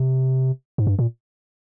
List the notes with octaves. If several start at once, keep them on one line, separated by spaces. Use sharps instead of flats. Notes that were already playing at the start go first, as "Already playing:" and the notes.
Already playing: C3
G#2
G2
A#2